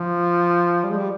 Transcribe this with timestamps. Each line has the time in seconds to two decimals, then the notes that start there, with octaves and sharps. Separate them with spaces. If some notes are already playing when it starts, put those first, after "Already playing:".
Already playing: F3
0.84 G3
0.91 G#3
0.98 G3